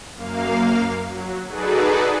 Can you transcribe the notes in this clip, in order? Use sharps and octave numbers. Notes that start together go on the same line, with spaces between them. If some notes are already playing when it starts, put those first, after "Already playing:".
F#2 A#3 F5
F#3
D#4 F#4 G#4 A4 B4 D5